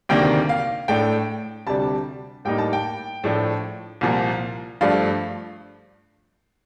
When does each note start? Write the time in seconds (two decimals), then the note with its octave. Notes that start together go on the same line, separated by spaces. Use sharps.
0.09 D2 C3 D#3 A#3 D4 G5
0.49 F5
0.88 A2 A3 D4 G5
1.67 D2 C3 G3 D4 A5
2.45 A2 G3 A#3 D#4 G5
2.58 A5
2.73 G5
3.24 A2 F3 A3 D4
4.01 C2 A#2 F3
4.81 G2 F3 A3 D4 F5